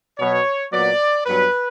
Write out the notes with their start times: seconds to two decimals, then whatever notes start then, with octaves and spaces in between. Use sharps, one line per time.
0.19 B2 F#3 B3 C#5
0.73 A#2 F#3 B3 D5
1.26 G2 F#3 B3 B4